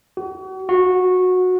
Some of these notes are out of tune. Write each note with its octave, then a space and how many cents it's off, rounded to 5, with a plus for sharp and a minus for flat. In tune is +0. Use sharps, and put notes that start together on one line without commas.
F#4 +40
F#4 -15